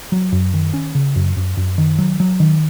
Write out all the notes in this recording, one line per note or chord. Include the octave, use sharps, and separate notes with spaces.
F#3
F#2
D#3
C#4
C#3
F#2
F#2
F#2
D#3
F#3
F#3
D#3